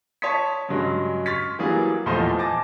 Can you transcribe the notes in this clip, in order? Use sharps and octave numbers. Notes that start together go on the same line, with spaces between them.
C#5 A5 C6 D#6 B6
G2 C#3 F#3 G#3
C6 C#6 F6 A6 B6
E3 F#3 G3 A#3 G#4
E2 A#2 F3 A3 C5 D#5
G#5 A5 D6 A6 A#6